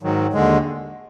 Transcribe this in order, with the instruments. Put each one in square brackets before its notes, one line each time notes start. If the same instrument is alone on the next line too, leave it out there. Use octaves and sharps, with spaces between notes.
[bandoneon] G#2 D#3 F#3
D#2 D3 G#3